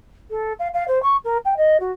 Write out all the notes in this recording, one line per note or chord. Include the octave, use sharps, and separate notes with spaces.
A4
F5
F5
C5
C#6
A#4
G5
D#5
F#4